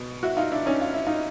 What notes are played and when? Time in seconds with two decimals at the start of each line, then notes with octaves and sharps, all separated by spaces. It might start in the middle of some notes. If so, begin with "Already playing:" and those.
Already playing: B2
0.23 E4 F#4
0.37 D#4 F4
0.52 D4 E4
0.66 C#4 D#4
0.81 F4
0.94 E4
1.07 D#4 F4